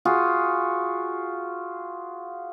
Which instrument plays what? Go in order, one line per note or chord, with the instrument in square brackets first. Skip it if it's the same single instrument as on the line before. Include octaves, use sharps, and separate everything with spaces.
[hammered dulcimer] F4 F#4 G#4